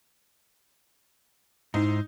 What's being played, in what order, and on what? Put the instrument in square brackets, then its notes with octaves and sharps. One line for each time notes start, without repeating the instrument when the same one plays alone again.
[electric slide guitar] G#2 E4 C5 [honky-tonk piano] D#4